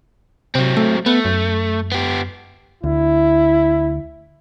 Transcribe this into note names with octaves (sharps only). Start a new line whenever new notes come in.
C3 F#3 C4
A3
A3 B3
F#2
B3 G4
D2 E4